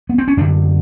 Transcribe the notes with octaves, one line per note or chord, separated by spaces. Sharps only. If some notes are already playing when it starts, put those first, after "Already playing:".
B3
C4
C#4
F#2 D3 D4